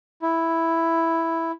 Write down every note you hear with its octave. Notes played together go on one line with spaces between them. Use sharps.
E4